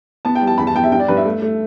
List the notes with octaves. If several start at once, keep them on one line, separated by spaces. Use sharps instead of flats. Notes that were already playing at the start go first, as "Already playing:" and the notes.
B3 A5
G5
G3
A5
E2 B5
A5
B3 G5
E5
G2 G5
D5
G2 B4
E5
A3
A3